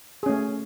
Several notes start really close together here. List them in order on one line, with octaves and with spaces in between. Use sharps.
G#4 C#4 A3